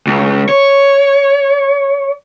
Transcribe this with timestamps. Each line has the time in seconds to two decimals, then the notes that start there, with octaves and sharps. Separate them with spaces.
0.07 C#2
0.49 C#5